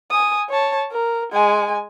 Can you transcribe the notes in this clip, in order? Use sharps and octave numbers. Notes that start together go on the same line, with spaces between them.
G#5 D#6
C#5 A5
A#4
G#3 G#5